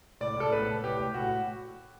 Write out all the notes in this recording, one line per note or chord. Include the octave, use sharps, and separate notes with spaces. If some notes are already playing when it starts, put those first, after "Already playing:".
A2 D5
A2 A4
B3 B4
A2
A2 G4
A2
A2 F#4